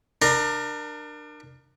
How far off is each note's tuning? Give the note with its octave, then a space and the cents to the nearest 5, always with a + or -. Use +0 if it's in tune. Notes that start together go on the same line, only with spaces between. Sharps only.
D4 +30 A#4 +5